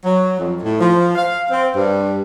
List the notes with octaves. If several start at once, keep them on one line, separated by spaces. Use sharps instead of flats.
F#3
F2
A2
F3
F5
C4
G2